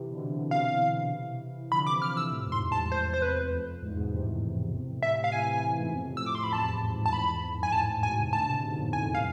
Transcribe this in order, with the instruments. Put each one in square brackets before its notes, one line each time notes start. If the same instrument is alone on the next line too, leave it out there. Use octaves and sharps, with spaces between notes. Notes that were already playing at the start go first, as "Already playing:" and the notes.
Already playing: [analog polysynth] C3 E3
B2 D3
C3 E3
[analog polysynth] C3 E3 [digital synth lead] F5
[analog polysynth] D3 F3 [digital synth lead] B5
[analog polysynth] C3 E3 [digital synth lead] D6
[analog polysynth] D3 F3 [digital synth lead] F6
[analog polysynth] C3 E3 [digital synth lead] E6
[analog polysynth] A2 C3
G#2
F2 A2
[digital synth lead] C6
[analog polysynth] E2 G#2
[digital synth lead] A5
[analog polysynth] F2
[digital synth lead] C5
C5
B4
[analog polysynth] F2
F2
E2 G#2
G#2 B2
A2 C3
[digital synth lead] E5
F5
[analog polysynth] C3 E3 [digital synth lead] G#5
[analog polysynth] C3 E3
A2 C3
G#2 B2
F2 A2
A2 C3
[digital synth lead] E6
[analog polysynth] F2 A2 [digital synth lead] D6
[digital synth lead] C6
B5
[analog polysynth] E2 [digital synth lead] A5
[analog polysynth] F2
E2 G#2
F2 A2
[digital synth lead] A5
[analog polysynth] E2 G#2 [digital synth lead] B5
[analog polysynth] E2
E2 G#2
F2
[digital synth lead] G#5
[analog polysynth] F2 A2 [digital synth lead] A5
[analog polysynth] G#2 B2 [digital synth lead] G#5
[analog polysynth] A2 C3
[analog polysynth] B2 D3 [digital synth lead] A5
[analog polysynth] A2 C3
G#2 B2
F2 A2
[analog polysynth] E2 G#2 [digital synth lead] G#5
[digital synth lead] F5